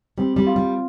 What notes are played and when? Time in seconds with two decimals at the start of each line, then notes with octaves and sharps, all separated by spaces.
0.18 G3 C4
0.36 G3
0.47 F4
0.56 G3